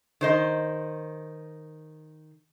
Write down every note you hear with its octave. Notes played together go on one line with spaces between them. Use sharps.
D#3 C5 D#5